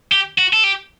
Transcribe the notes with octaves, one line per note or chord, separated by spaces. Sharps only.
G4
F#4
A4
G4